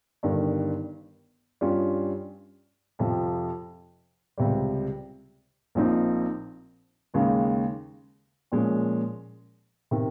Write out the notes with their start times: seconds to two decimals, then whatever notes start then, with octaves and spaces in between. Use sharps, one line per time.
0.23 G1 G2 D#3 G3
1.61 G2 G3 C#4 F4
2.99 F2 C3 F3
4.38 C#2 C3 G3
5.75 A#1 A#2 F3 C4 D#4
7.14 D#2 C#3 G#3 C#4
8.52 A#2 F3 G#3 C#4
9.91 C3 D#3